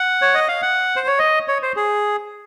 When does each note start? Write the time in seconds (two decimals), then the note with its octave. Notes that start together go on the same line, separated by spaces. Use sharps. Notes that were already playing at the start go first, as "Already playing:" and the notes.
Already playing: F#5
0.22 C#5
0.34 D#5
0.48 F5
0.62 F#5
0.96 C5
1.07 C#5
1.19 D#5
1.48 C#5
1.62 C5
1.76 G#4